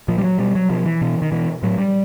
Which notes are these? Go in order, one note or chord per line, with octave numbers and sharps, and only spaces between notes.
A#2 F3
G3
F#3
B2 G3
F#3
B2 F3
E3
B2
D#3
B2 E3
A2 F#3
G3